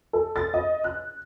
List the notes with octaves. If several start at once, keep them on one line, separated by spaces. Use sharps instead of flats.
A4
A6
D#5
F#6